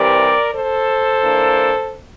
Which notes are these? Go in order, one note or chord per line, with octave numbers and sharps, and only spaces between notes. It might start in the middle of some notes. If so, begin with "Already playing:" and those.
Already playing: C3 E3 G3 C4 A#4 D5
A4 C5
E3 A#3 D4